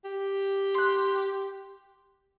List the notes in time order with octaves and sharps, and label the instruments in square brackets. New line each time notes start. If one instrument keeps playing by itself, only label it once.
[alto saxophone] G4
[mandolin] C6 F#6